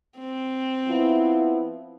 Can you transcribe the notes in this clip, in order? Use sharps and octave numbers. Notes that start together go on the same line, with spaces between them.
C4
F3 B3 E4